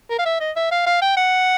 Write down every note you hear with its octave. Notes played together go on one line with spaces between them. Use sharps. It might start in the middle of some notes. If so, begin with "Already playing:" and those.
A#4
F5
E5
D#5
E5
F5
F5
G5
F#5